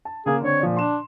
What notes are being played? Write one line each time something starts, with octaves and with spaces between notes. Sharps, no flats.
A5
C#3 A#3 G#4
D3 C4 C#5
A#2 F3 D4
D4 C6 E7